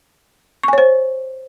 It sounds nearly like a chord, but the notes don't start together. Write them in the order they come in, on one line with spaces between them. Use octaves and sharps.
C#6 G#5 C#5 C5